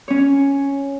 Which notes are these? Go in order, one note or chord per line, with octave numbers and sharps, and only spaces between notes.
C#4 C#5